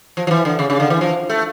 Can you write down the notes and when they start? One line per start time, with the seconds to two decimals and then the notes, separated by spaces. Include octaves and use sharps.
0.17 F3
0.27 F3
0.31 E3
0.45 D3
0.59 C#3
0.70 C#3
0.80 D3
0.90 E3
1.01 F3
1.30 A3